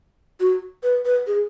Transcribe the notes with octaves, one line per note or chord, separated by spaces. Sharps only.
F#4
B4
B4
G#4